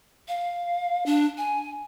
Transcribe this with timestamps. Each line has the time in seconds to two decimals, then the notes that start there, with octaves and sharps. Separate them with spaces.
0.28 F5
1.06 D4
1.38 G#5